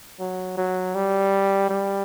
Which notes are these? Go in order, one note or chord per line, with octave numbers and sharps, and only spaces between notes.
F#3
F#3
G3
G3